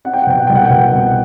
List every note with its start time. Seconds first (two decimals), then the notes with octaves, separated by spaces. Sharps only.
0.05 C4 F#5
0.13 G5
0.22 F#5
0.27 B2 G5
0.39 F#5
0.47 C2 G5
0.56 F#5
0.65 G5
0.70 B2 F#5
0.93 C2